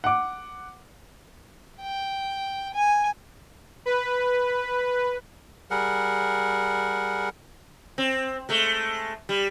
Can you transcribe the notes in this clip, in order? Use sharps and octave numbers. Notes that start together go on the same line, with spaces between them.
F#5 D6
G5
G#5
B4
G3 G#4 A#4 F#5
C4
G#3 A3
G3